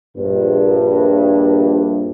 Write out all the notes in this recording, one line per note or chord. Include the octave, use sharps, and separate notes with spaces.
A#1 G2